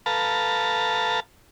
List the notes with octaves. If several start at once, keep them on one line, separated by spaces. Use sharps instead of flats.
A4 B4 F5 A5 A#5